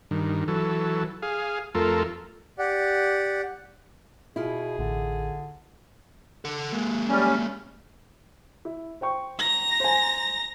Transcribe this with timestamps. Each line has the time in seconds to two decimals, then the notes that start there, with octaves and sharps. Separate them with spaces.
0.11 G2 D#3
0.48 E3 F#3 A4
1.22 G#4 F5
1.75 F2 A3 F4 A4 A#4
2.59 G4 D5 F#5
4.36 B2 E4 F4 G#4
4.79 A1 D3
6.45 A4 F#5
6.73 G#3 A#3
7.08 G3 C#4
8.65 E4
9.01 C5 G5 C#6
9.39 A#5 A#6
9.80 C5 G#5